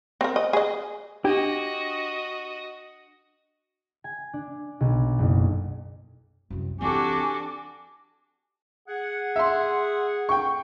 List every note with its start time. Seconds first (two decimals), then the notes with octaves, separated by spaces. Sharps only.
0.21 C4 A#4
0.36 D#5
0.53 G#4 D#5
1.25 D4 F#4 G4 D#5
4.04 G#5
4.33 D4
4.80 B1
5.19 F#1
6.50 C2 F#2
6.81 E3 C4 D4 F#4 G4 A4 G#5 D6
8.88 G#4 F#5
9.36 E5 C6
10.29 G5 C#6